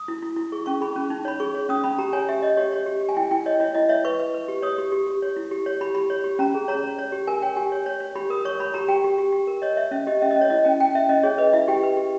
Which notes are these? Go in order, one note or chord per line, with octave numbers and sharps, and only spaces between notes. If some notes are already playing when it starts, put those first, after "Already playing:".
Already playing: D#6
E4
E4
E4
G#4 C#6
C#4 C#6
G#4 B5
C#4
D#4
C#5 B5
G#4 C#6
C#5
C#4 D#6
C#4 B5
G4 A#5
C#5 G#5
G4 E5
C#5 D#5
G4 C#5
C#5
G4
G4
G#5
E4 G5
E4 G5
C#5 D#5
E4 C#5
E4 D#5
C#5 E5
B4 C#6
B4
B4
G4
C#5 D#6
G4
G4
G4
C#5
E4
G4
C#5
G4 B5
G4 B5
C#5
G4
C#4 A#5
G#4
C#5 A#5
C#5
C#5
G4
A#4 G#5
C#5 G5
G4 G#5
C#5
C#5
C#5
G4 B5
A#4 D#6
C#5 C#6
C#5 B5
G4 A#5
G4 G5
G4
G4
G4
A#4
C#5 D#5
C#5 E5
C#4 E5
G4 D#5
C#4 E5
D#5
C#4
C#5
E4 D#5
C#4 G5
C#4 G5
C#4 E5
C#4 D#5
G#4 C#5
B4 D#5
E4 E5
G4 G5
B4
G4